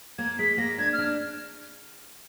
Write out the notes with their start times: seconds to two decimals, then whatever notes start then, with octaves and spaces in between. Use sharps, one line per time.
0.18 A#3 G#6
0.38 G#3 B6
0.58 A#3 A#6
0.78 D4 G#6
0.93 F6
0.98 D4